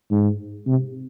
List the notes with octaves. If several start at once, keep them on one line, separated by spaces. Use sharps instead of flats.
G#2
C3